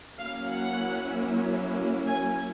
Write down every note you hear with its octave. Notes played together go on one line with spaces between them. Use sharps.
F#3 A#3 C#4 E4 F5
F#5
G#5